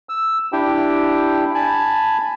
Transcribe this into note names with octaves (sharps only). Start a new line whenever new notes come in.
E6
D4 E4 G4 G5
G#5 A5 B5